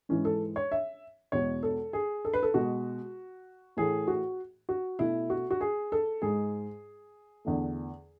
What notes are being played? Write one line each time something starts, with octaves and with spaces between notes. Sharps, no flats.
G#2 E3 G#3 C#4
A4
C#5
E5
E2 B2 G#3 C#5
A4
G#4
A4
B4
A4
B2 G#3 F#4
A2 E3 A3 G#4
F#4
F#4
B2 A3 E4
F#4
F#4
G#4
A4
G#2 G#3 G#4
E2 D3 A3